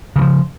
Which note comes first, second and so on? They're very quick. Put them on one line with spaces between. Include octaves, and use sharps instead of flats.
C#3 E3 F3